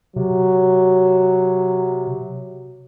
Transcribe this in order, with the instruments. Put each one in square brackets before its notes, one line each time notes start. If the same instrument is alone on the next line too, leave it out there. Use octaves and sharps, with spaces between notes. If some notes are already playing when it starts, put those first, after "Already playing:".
[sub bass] C3 [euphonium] F#3